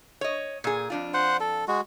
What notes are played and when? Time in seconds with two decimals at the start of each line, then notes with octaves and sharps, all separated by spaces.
0.21 C#5 D#5
0.64 A#2 G#4
0.90 F2 D4 F4
1.14 C5 F#5
1.40 A4
1.68 G#3 F#4